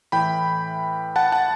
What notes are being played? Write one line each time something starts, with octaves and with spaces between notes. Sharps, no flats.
A2 E3 G5 B5
F#5 A5
F#5 A5